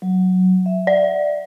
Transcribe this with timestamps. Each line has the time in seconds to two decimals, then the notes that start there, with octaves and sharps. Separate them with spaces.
0.02 F#3
0.66 E5
0.87 D5